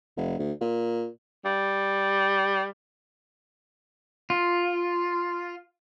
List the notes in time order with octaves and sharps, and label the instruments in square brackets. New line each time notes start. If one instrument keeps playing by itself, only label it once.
[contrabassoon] F1
D2
A#2
[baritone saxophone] G3
[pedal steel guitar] F4